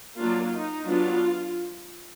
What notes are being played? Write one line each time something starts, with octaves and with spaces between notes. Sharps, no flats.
F#3 A#3 D4 F4
D#4
F#3 B3 D4 F4